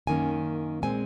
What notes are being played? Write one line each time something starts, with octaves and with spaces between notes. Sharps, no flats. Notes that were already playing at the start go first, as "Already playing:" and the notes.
F#2 D#3 A#3 C#4 G#5
A#2 G#3 C4 G#5